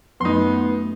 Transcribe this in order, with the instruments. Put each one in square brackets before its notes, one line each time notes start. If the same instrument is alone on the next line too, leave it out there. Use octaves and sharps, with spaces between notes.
[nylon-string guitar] F#2 A3 [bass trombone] B3 [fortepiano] D#4 C6